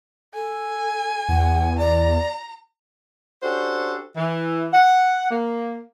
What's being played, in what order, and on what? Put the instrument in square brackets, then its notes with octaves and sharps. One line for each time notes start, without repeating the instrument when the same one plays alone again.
[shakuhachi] A4 [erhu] G#5
[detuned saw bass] E2 [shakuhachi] F#5
[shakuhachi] D5 [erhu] A#5
[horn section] C#4 D4 F#4 G4 A4 C5
E3
F#5
A#3